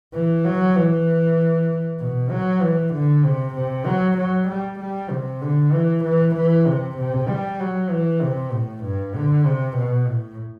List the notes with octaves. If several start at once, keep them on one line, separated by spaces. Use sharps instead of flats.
E3
F#3
E3
B2
F#3
E3
D3
C3
C3
F#3
F#3
G3
G3
C3
D3
E3
E3
E3
C3
C3
G3
F#3
E3
C3
A2
G2
D3
C3
B2
A2